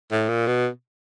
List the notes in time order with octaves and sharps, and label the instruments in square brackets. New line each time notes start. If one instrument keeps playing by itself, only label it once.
[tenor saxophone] A2
A#2
B2